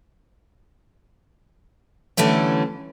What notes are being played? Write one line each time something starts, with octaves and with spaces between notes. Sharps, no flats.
D3 E3 G3 A3 C#4